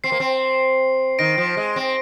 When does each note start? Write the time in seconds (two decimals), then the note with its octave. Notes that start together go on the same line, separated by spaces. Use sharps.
0.04 C4 C7
0.12 A#3
0.20 C4
1.19 D#3 A#6 D7
1.38 F3
1.57 G#3
1.76 C4